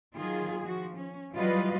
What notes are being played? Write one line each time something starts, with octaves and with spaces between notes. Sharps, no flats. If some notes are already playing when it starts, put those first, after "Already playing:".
D#3 F#3 F4 G#4
F3 F#4
C#4
E3 F#3 G3 F4 B4 D#5